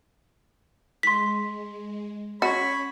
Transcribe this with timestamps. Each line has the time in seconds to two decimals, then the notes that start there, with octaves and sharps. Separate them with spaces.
1.03 G#3 C6 B6
2.42 C#4 F#4 C#5 B5